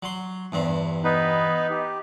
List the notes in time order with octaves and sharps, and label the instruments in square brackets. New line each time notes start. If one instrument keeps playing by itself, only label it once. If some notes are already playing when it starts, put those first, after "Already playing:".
[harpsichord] F#3 C6
E2 G2 C4
[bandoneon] B3 D#4 B4
G4